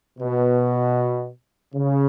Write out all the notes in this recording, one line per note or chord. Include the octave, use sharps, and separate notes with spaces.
B2
C#3